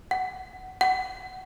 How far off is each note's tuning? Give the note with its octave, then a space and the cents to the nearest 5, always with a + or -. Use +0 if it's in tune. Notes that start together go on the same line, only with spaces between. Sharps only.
F#5 +15
F#5 +20